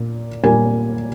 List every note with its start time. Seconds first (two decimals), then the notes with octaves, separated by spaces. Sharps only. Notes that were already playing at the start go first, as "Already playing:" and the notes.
Already playing: A#2 A#3
0.43 A#2 G3 A#3 G#5